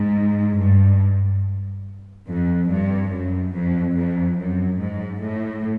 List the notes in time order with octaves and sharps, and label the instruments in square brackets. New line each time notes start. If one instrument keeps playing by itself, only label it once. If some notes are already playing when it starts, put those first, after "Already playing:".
Already playing: [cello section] G#2
G2
F2
G2
F#2
F2
F2
F#2
G#2
A2